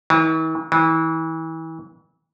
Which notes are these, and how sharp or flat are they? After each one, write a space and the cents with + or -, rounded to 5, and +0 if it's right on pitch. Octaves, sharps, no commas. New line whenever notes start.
E3 -45
E3 -30